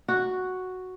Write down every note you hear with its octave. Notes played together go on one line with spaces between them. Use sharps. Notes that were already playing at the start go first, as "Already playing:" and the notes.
F#4